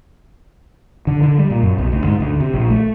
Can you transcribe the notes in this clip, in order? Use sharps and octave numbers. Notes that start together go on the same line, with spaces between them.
D3
D3
G3
A#2
F#2
B1
D2
G#2
D2
C3
A#1
A3